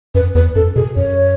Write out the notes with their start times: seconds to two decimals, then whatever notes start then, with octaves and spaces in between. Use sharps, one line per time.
0.15 F#2 B4
0.35 E2 B4
0.55 F#2 A4
0.76 B2 G#4
0.96 F#2 C#5